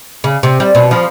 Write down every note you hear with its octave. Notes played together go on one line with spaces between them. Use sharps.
C#3
C3
G3
B2
F3